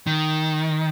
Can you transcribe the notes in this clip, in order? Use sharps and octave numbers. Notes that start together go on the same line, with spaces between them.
D#3